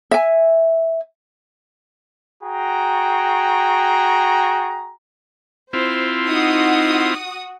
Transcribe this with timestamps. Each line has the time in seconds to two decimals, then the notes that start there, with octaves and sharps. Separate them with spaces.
0.11 E5 G#5
2.43 F#4 G#4 G5 A#5
5.73 C4 E4 F4 C5
6.28 D#4 F#4 F#5 D#6